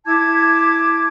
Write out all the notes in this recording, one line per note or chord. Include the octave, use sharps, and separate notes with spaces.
E4 A5 D6 G#6